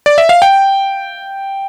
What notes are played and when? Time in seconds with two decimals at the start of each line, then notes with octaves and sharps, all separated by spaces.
0.06 D5
0.18 E5
0.29 F5
0.42 G5